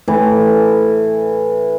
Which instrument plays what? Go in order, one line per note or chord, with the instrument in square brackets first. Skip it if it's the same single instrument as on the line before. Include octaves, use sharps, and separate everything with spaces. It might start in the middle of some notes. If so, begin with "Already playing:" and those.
[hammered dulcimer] A2 E3 E4